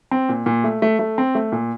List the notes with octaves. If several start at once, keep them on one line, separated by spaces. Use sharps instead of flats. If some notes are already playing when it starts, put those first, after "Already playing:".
C4
A#2
A#2
A3
A3
A3
C4
A3
A#2